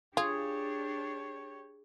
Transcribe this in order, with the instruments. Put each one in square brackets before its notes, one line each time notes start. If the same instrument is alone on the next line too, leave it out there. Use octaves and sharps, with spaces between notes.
[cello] D4 [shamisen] F4 [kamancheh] G4 C#5 [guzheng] G#4